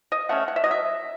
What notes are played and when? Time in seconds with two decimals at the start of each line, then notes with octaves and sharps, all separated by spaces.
0.12 D#5
0.29 A3 C#4 F#5
0.48 F#5
0.56 E5
0.64 F#3 D#5
0.71 E5